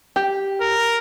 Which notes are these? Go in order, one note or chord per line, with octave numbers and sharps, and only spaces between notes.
G4
A#4